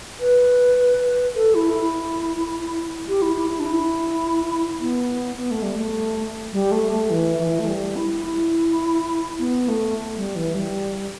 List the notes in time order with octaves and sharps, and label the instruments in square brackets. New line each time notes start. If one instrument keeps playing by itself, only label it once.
[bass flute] B4
A4
E4
E4
G4
E4
E4
E4
D4
E4
B3
B3
A3
G3
A3
G3
A3
A3
E3
E3
A3
G3
E4
E4
B3
A3
G3
E3
G3